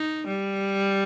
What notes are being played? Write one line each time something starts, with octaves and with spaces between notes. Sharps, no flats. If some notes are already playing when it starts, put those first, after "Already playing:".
Already playing: D#4
G3